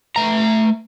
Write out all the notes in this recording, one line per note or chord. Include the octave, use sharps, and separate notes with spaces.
A3 A#5